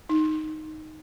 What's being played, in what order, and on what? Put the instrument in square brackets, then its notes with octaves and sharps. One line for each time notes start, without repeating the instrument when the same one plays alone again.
[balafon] D#4